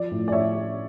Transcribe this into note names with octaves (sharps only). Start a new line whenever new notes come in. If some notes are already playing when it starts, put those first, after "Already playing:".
Already playing: F3 D5
A2
D5
A2 C#5 E5